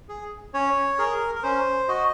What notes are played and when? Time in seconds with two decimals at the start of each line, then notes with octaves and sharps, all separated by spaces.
0.09 G#4
0.54 C#4 C#5
0.99 G#4 A#4
1.35 A#4
1.43 C#4 C5
1.88 F#4 D#5